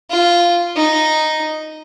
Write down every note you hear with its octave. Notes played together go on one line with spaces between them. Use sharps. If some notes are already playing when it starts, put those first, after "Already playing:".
F4
D#4